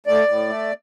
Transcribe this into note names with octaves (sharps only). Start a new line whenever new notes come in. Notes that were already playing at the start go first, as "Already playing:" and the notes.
A2 D5
A2
A3